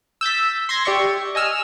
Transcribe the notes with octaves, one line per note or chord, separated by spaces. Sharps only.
E6 G6 A6 B6
C6 G#6 A#6
G4 D5 E5 C#6
D#5 G#5 E6 F6